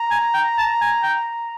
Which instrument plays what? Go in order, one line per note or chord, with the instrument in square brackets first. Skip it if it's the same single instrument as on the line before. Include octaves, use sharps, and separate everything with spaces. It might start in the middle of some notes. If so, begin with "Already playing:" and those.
Already playing: [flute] A#5
[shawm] G#5
G5
A5
G#5
G5